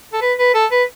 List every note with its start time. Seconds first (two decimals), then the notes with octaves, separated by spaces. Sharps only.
0.13 A4
0.22 B4
0.38 B4
0.55 A4
0.72 B4